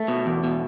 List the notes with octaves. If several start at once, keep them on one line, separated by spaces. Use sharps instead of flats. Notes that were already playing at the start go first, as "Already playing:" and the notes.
Already playing: A3
B2
E2
B2